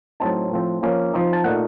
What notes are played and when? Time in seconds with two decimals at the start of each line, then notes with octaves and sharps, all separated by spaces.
0.20 A2 F#3 C4 D#4 A5
0.51 A2 F3 C4
0.82 F3 A#3 C#4
1.14 F3 C4 D#4
1.33 A5
1.44 A#2 A3 D#4 F#5